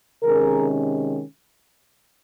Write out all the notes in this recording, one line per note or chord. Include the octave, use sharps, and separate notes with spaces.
C3 D#3 G#3 C#4 G#4 A#4